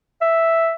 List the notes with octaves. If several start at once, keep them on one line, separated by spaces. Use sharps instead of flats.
E5